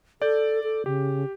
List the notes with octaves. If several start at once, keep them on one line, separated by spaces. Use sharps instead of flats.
A4 D5 G6
A4
C#3 G4